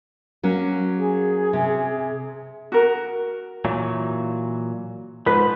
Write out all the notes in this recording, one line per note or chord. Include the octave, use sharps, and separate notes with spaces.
F#3 A#3 C#4
G#4
C3
F#4 A#4
A#2 E3 F#3
G#2 F3 B4